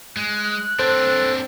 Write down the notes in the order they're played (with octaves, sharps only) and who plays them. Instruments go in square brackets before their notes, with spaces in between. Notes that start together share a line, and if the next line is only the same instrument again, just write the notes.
[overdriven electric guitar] G#3 [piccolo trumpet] F#6
[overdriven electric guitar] C4 D4 [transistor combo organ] A4 [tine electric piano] C5